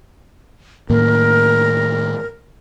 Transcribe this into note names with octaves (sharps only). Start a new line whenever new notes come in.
A2 D#3 A#3 A#4